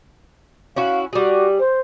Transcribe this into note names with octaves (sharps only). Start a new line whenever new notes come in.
C#4 E4 F#4 F5
G3 F#4 G#4
C5